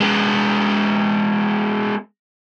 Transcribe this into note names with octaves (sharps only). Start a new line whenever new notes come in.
G#3 B3